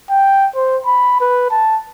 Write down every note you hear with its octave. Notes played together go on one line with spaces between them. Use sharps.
G5
C5
B5
B4
A5